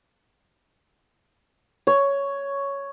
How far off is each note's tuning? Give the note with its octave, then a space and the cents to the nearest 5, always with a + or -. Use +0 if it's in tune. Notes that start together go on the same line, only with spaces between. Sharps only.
C#5 +5